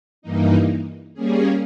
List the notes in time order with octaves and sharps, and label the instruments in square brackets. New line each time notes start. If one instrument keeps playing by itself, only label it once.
[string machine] G2 E3 A#3 D#4
G3 A#3 C#4 G#4